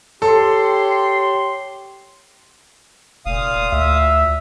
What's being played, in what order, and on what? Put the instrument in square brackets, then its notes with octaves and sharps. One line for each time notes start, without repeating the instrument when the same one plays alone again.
[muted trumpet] G4 [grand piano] A4 [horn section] C#5 C6
[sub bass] F1 [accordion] A#2 F5 D#6
[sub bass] D2 [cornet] E5